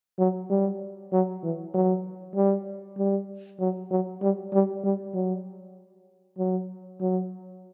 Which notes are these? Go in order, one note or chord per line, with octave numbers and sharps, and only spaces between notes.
F#3
G3
F#3
E3
F#3
G3
G3
F#3
F#3
G3
G3
G3
F#3
F#3
F#3